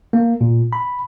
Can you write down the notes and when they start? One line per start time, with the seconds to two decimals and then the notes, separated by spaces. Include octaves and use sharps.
0.13 A#3
0.41 A#2
0.73 B5